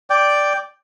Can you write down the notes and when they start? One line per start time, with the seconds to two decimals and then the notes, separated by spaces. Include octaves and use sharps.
0.10 D5 G5